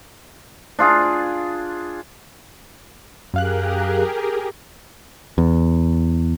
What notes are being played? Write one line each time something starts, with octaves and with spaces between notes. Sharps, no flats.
D4 F4 G#4
F#2 G4 G#4 A#4 F5 F#6
E2